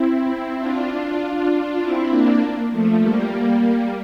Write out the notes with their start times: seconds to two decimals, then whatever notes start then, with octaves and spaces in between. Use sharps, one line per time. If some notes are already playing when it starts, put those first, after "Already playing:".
Already playing: C4 E4
0.59 D4 F4
1.80 C4 E4
2.10 A#3 D4
2.71 F3 A3
3.01 G3 A#3